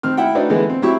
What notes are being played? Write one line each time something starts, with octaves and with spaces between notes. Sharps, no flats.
D#3 C4 F6
E4 E5 F#5 G5
A3 D4 D#4 F#4 A4 B4
D3 E3 G#3 B3
C4
F#3 C4 E4 G4 E5 C#6